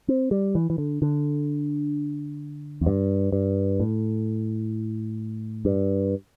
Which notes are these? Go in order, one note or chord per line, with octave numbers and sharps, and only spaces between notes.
C4
G3
E3
E3
D3
D3
E2
G2
G2
A2
G2